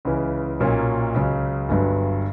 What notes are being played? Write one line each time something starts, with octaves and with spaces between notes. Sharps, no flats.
C#2 C#3 E3
B1 A#2 F#3 A#3 C#4
C#2 C#3 F#3
G1 G2 F#3